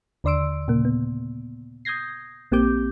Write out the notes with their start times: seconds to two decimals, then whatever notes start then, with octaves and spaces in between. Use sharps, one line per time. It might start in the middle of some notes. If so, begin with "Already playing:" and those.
0.24 D#2 D3 D5 C6 E6 D7
0.68 A#2 C#3 A#3
0.85 B3
1.85 D#6 G6 G#6 A#6 C7
2.52 A#1 A#3 C4 G4 D6 G6